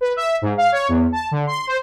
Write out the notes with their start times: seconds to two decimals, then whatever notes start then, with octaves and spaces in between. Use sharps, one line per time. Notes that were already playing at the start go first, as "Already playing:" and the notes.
0.01 B4
0.16 E5
0.42 G#2
0.57 F5
0.72 C#5
0.88 E2
1.12 A5
1.31 D3
1.47 C6
1.67 C5